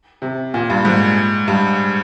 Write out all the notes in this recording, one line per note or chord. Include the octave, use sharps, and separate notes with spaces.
C3
A#2
G2
G#2
G2